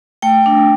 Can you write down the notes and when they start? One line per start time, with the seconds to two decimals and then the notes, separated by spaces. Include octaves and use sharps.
0.22 A3 G5
0.46 D4